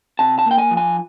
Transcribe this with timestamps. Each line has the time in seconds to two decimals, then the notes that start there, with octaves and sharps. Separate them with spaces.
0.19 C3 A5
0.39 A5
0.46 A#3
0.51 G5
0.58 G#5
0.71 F3
0.77 G#5